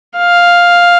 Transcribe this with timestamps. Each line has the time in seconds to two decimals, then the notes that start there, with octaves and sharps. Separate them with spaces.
0.18 F5